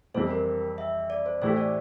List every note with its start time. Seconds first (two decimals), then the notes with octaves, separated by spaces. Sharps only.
0.14 F2 E3 G3 C4 G4 C5
0.31 A#4
0.78 E5
1.10 D5
1.26 C5
1.42 A2 E3 A3 E4 G4 C5
1.57 D5